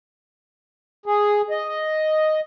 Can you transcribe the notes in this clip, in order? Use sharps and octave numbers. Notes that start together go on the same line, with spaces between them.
G#4
D#5